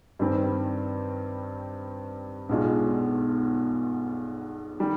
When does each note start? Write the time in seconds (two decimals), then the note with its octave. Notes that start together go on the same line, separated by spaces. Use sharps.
0.19 G2 D#3 G3 C4
2.49 B1 B2 G#3 D4 F4
4.80 D#3 G3